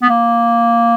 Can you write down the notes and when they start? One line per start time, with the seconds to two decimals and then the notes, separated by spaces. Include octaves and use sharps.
0.02 B3
0.10 A#3